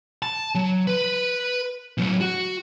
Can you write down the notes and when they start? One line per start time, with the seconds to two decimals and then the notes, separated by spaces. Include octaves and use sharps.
0.22 A5
0.55 F#3
0.87 B4
1.98 A2 F#3
2.20 F#4